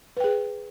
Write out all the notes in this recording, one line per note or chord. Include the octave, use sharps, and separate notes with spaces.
G#4 B4 G5